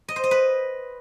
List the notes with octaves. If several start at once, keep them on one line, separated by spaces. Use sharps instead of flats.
D#5
C5
D#5
B4